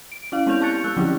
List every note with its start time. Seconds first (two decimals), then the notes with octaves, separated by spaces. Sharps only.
0.12 D7
0.32 C#4 E4 F5
0.46 G#3 B3 C4 E4 G6 F7
0.61 G4 A5 C#6 F#6 A6 C#7
0.84 G#3 E6 F#6
0.97 D3 F3 F#3 C4 C#4 E4